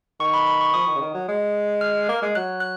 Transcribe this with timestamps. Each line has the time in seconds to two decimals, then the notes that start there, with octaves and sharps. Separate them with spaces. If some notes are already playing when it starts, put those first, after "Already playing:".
0.20 D#3 C#6
0.34 B5
0.47 B5
0.61 C#6
0.74 F3 D#6
0.87 D#3
0.96 C#3
1.01 D#3
1.14 F#3
1.28 G#3
1.81 F6
2.09 A#3
2.22 G#3
2.35 F#3 F#6
2.60 F#6